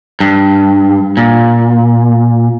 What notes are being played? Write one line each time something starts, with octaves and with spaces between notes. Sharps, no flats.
G2
A#2